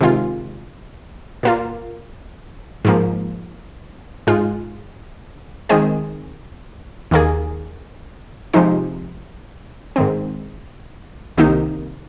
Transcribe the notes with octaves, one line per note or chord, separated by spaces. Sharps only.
C3 D#3 G#3 F4
A#2 A#3 F4
G#2 F3 A#3
G#2 G#3 F4
D#3 G#3 C4 G#4 D#5
D#2 D#3 A#3 G#4
C3 F3 G#3 D#4 C5
G#2 D#3 C4
C2 C3 D#3 A#3 D#4